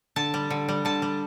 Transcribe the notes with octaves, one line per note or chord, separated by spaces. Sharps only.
D3 A5
G3
D3
G3
D3 A5
G3